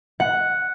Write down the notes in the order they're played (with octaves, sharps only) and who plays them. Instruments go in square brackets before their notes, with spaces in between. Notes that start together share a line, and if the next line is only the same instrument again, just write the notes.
[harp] F#5